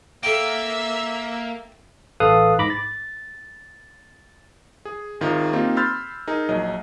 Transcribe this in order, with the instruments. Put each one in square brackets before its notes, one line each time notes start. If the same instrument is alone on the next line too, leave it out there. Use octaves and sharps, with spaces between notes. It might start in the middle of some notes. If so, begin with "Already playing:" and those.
[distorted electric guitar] A#3 [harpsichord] A4 G5 [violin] E5 E6
[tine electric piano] A1 A4 B4 F5 D#6 F#6
G#2 B5 D6 A#6
A6
[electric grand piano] G#4
G#1 D#3 F4 G#4
A#3 C4 D#4 F4 G4
B5 C6 E6 F6 G6 A6
D#4 G#4 A#4
A#1 F#3 D#5